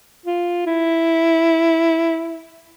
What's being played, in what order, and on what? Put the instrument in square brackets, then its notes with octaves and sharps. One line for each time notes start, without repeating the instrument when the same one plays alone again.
[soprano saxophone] F4
E4